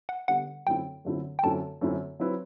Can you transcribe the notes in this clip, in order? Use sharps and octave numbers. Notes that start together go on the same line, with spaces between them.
F#5
D3 G3 B3 F#5
F#2 D3 A3 C4 E4 G5
F#2 D3 A3 C4 E4
G5
F#2 D3 A3 C4 E4 A5
F#2 D3 A3 C4 E4
F#3 C4 E4 B4